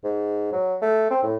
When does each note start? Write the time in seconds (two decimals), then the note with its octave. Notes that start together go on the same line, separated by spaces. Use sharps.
0.04 G#2
0.52 F#3
0.82 A3
1.10 C4
1.23 A2